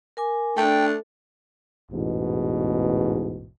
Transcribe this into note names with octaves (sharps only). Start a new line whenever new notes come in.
A#4 G#5 D6
A3 D4 A4 G5
A1 E2 G#2 B2